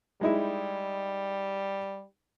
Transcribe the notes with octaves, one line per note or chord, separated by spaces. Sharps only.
G3 G#3 D#4 E4